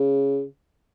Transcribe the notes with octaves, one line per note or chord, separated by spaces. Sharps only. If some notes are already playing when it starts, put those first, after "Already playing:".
Already playing: C#3